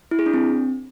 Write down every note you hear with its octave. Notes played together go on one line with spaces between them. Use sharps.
E4
G#4
D4
C4